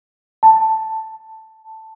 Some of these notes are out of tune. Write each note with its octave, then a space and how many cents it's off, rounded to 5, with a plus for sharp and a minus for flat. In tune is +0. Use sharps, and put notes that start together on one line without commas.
A5 +5